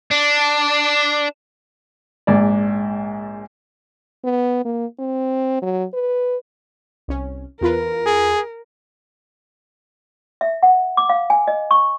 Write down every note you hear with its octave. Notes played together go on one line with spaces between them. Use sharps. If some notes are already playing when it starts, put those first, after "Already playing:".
D4
A#1 G#2 D5
B3
A#3
C4
F#3
B4
C2 C#4
E2 F4 A#4 B4
G#4
E5
F#5
D6
F5
G#5
D#5
C#6